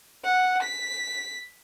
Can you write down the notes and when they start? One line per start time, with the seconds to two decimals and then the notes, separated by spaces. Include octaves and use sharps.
0.24 F#5
0.63 B6